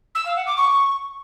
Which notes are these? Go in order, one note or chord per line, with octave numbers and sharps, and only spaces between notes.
E6
F5
F#5
D6
C#6